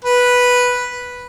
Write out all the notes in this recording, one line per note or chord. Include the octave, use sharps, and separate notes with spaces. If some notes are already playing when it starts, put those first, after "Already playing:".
B4